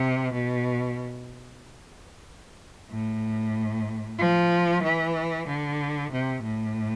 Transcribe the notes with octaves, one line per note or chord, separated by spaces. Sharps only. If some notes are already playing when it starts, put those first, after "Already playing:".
Already playing: C3
B2
A2
F3
E3
D3
C3
A2